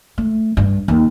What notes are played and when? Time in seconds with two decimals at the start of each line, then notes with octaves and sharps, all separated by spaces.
0.18 A3
0.57 G2
0.88 D#2